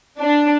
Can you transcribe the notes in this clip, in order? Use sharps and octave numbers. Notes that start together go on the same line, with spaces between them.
D4